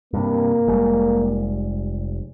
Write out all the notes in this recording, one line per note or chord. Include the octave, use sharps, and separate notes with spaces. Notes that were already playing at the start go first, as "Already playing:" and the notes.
G2 C3 A#3
F1 G3 G#3